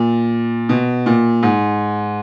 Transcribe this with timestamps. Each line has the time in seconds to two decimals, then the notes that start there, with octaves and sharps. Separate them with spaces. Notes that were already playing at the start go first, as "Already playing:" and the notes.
Already playing: A#2
0.69 B2
1.06 A#2
1.43 G#2